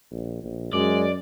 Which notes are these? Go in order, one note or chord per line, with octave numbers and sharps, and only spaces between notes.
A#1
A#1
F#2 G#3 D5